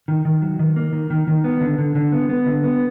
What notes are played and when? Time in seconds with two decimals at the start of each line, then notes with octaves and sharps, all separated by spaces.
0.08 D#3
0.25 D#3
0.42 F#3
0.59 D#3
0.76 A#3
0.93 D#3
1.10 D#3
1.27 D#3
1.44 B3
1.61 D3
1.78 D3
1.95 D3
2.12 B3
2.29 B3
2.46 D3
2.64 B3